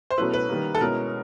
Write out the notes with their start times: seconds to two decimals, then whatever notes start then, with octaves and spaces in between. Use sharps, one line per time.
0.10 C5
0.17 B2 F#3 A3 C#4 E4 B4
0.34 B4
0.49 D#3 G3 A#3
0.75 A4
0.81 B2 G#3 C#4 E4 A#4